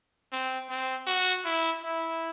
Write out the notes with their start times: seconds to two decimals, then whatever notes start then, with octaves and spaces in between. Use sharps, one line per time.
0.32 C4
0.69 C4
1.07 F#4
1.45 E4
1.82 E4